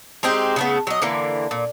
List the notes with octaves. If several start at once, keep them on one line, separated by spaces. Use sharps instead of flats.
G#3 C4 D#4 G4
C#3 A3 B3
F#3 D#5
D3 E3 A#3
A#2